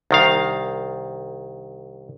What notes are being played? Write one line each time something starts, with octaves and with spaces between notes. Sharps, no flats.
C2 D#3 F5